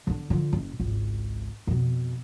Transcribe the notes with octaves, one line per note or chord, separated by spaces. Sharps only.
D3 D4
D3 F3
F#1
G#1 C#2
F2 B2